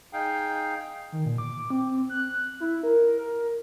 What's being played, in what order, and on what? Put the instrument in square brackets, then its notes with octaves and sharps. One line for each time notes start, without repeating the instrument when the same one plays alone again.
[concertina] D#4 G#4 F5 G5
[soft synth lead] D#3
A#2
D6
C4
F#6
E4
A#4
A#4